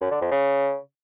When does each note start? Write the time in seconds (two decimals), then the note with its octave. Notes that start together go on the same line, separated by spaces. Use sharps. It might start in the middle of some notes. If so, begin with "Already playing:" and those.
0.01 F#2
0.11 D3
0.21 F2
0.31 C#3